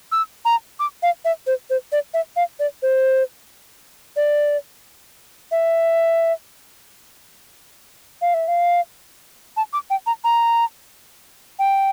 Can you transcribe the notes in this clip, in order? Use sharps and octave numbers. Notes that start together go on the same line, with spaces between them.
E6
A#5
D6
F5
E5
C5
C5
D5
E5
F5
D5
C5
D5
E5
F5
E5
F5
A5
D6
G5
A#5
A#5
G5